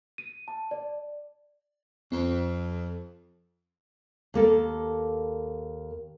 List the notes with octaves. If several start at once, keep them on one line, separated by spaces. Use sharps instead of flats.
D#7
A5
D5
F2 C4
D#2 A#3 A4